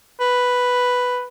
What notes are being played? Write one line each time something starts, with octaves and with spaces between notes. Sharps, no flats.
B4